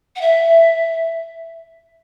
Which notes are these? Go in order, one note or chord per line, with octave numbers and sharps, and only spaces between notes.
F#5
E5